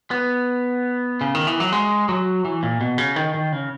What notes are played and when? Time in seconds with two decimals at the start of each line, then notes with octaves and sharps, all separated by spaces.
0.11 B3
1.21 C#3
1.35 D#3
1.47 E3
1.60 F#3
1.72 G#3
2.09 F#3
2.45 E3
2.63 A#2
2.81 B2
2.98 C#3
3.16 D#3
3.34 D#3
3.52 C#3